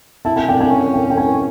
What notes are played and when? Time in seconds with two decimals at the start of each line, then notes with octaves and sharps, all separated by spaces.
0.25 E4 A5
0.36 G#5
0.49 D4 G5
0.61 G#5
0.71 C#4
0.93 G5
1.10 G5
1.17 G#5